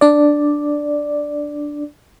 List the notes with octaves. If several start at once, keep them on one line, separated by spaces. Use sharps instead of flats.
D4 D5